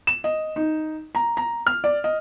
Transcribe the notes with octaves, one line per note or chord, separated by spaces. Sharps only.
E7
D#5
D#4
A#5
A#5
F6
D5
D#5